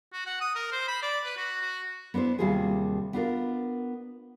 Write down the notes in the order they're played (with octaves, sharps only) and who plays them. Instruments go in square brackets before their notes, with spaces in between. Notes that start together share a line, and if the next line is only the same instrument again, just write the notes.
[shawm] F#4
F#5
D#6
A#4
C5
B5
D5
B4
F#4
F#4
[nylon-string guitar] B3 D4 E4 C5
D#2 C3 G3 F4 F#4 G#4
B3 D4 F4 A#4